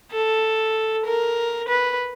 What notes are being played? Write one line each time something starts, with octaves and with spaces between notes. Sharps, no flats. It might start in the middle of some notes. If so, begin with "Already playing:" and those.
A4
A#4
B4